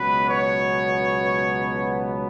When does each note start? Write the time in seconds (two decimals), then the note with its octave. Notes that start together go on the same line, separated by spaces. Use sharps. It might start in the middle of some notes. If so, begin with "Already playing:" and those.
Already playing: C#2 B2 F#3 B3 B4
0.29 C#5